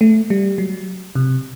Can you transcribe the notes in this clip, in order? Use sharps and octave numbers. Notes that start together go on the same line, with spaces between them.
A3
G3
F#3
C3